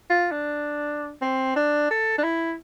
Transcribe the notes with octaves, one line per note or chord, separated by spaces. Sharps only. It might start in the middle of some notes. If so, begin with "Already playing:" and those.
F4
D4
C4
D4
A4
D4
E4